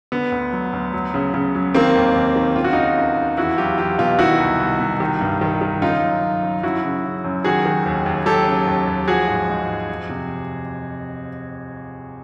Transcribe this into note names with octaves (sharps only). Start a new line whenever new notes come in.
D3 B3
D2
F#3
D2
F#3
C#3
C#3
F#3
D#3 A#3 C4
D#2
D#2
D#3
C#3 F4
F#4
C#3 D#4 F4
C#2
C#2
E2 E4 F#4
F#3 F4 G4
E2 F4 G4
B2 F4 G4
D#3 E4 F#4
C2
C2
C2
D#3
G2
D#3
D#3
C#3 D#4 F4
F#2
F#2
F#2
F#2 E4 F#4
C#3
C#3
F#2
D#3 F#4 G#4
D#3
D#2
D#2
F#3 G4 A4
C#3
D#2
D#2
F3 F#4 G#4
G#2
G#2
F3
F2
C3